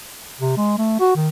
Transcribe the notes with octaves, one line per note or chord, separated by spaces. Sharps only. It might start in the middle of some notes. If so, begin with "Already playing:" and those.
C3
G#3
A3
F#4
D#3